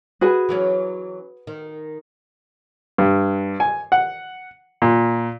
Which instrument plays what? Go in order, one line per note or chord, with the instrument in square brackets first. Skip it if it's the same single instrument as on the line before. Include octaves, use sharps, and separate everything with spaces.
[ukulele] F#4 G#4 B4
[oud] E3 F#3 C#4
D#3
[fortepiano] G2
G#5
F#5
A#2